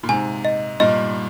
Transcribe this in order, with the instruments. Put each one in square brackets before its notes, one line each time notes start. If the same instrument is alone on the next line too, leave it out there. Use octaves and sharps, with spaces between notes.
[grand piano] A#2
[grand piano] G#2 C3 [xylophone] G#5
[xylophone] D#5
[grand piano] G2 A#2 [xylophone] D#5